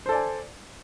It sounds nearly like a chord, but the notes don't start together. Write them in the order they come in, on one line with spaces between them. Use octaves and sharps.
C5 A4 D5 G#5